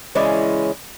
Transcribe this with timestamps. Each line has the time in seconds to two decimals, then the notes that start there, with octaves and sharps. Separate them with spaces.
0.15 C#3 E3 G#3 C#4 E4 D5